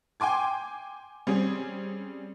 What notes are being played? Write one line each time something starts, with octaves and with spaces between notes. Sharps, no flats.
G5 G#5 C6 D6 G#6
G3 C4 C#4 G#4